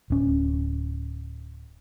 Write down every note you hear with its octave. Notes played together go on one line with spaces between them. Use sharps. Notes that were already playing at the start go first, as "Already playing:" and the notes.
D1 C#4